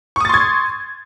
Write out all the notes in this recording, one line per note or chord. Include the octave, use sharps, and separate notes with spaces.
C6 C#6 D#6 G#6 A6